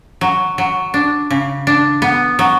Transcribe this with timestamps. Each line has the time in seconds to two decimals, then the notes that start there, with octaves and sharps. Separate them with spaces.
0.21 F#3
0.58 F#3
0.94 D4
1.30 C#3
1.67 D4
2.02 B3
2.39 F#3